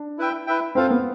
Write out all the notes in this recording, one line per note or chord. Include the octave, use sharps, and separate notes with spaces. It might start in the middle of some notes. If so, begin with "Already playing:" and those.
Already playing: D4
E4 B4 E5 G5
E4 B4 E5 G5
C4 F4 A4 C5 F5
B3